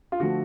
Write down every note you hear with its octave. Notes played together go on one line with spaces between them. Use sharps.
F4
D3 F3 A3 F#4